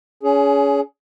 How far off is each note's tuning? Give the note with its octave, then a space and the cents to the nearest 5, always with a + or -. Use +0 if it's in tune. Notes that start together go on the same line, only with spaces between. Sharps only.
C#4 +30 G#4 +10